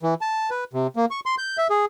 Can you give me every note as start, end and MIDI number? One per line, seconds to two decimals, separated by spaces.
0.03 0.14 52
0.21 0.50 81
0.50 0.64 71
0.74 0.87 48
0.96 1.05 58
1.11 1.20 85
1.26 1.35 84
1.38 1.57 91
1.58 1.67 76
1.70 1.85 68